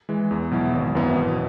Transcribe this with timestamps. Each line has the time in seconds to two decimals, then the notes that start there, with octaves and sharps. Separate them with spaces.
0.09 E3 G#3
0.31 E2
0.51 B2 F#3 E4
0.73 G#1
0.95 F#2 E3 B3 E4
1.16 B2